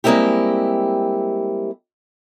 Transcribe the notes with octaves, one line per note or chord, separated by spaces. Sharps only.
G3 G#3 A#3 C4 E4 G4